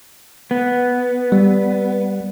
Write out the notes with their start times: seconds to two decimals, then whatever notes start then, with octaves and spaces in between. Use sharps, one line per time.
0.51 B3
1.32 G3